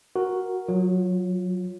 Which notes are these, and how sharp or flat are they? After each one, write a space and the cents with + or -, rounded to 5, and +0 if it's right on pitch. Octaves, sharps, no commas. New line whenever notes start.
F#4 +0 A#4 +0
F#3 -10 F4 +25